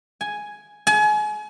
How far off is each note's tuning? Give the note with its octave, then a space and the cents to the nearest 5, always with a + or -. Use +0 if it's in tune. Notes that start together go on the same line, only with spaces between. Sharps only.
G#5 +5
G#5 +35